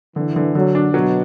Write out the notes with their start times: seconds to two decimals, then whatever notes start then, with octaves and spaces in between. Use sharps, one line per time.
0.16 D3 E3
0.36 D3
0.55 D3 F#3
0.75 D4
0.94 B2 F#3